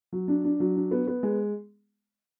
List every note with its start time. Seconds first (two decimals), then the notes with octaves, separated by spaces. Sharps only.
0.12 F#3
0.28 D4
0.44 D4
0.60 F#3
0.76 D4
0.91 B3
1.07 B3
1.23 G#3